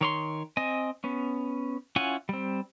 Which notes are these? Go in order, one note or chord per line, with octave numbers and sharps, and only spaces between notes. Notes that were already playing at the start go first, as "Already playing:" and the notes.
D#3 C#5 C6
C4 D#5 G#5
B3 C#4
C#4 E4 F4 F#5 G#5
G3 C4